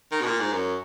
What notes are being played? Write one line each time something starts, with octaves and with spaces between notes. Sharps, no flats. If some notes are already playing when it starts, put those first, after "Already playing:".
D#3
B2
A#2
G#2
F#2